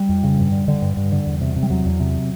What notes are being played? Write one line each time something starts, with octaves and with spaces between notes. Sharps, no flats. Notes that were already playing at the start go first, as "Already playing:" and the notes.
Already playing: G3
F2
C#3
G2
D3
D3
G2
G2
D3
E2
C3
C3
G3
E2 F#3
E2
C3